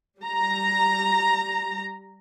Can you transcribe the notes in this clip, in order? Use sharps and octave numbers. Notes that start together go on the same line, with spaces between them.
G3 A#5